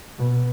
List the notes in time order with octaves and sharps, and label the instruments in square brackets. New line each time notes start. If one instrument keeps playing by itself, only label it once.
[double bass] B2